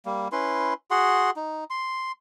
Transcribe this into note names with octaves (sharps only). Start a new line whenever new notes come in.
G3 A#3
C#4 E4 B4 C6
F#4 G#4 F#5 C6
D#4
C6